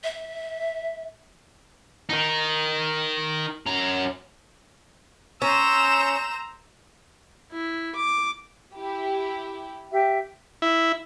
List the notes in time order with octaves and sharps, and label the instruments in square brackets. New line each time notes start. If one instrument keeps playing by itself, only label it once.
[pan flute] E5
[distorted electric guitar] D#3 D#4
F#2 A#5
[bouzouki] C#4 [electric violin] C5 E6 [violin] A#5 E7
[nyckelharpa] E4
D6
[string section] E4 G4
[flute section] G4 E5
[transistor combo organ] E4